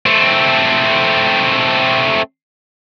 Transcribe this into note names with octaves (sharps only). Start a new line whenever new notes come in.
A3 C4